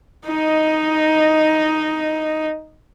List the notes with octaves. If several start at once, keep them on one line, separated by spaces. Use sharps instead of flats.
D#4 D#5